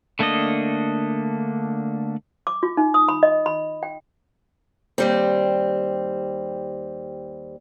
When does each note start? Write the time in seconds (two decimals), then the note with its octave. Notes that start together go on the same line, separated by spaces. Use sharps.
0.19 D3 A3 A#3 D4 D#5
2.47 D6
2.63 F4
2.77 D#4
2.94 D#6
3.09 B5
3.23 D#5
3.46 B5
3.83 G5
4.98 D#2 G3 C4